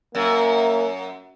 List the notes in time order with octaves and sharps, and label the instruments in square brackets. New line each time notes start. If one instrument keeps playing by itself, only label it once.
[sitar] F#2 [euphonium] A#3